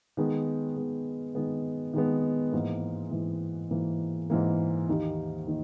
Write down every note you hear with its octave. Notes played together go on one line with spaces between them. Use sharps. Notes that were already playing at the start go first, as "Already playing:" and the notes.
D#3 G#3 B3
D#3 G#3 B3
D#3 G#3 B3
D#3 G#3 B3
G#2 E3 A#3
G#2 E3 A#3
G#2 E3 A#3
G#2 E3 A#3
D#2 D#3 A#3 D#4 G4
D#3 A#3 D#4